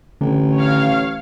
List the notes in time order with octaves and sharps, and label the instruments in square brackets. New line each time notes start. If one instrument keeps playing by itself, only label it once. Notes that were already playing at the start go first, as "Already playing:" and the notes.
[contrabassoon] A1 [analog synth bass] D3
[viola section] C#5 F5